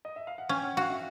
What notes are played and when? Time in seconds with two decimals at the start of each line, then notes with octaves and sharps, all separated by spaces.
0.05 D#5
0.16 E5
0.27 F5
0.38 F#5
0.49 C#4 G5
0.63 F#5
0.77 F#4 F5
0.90 E5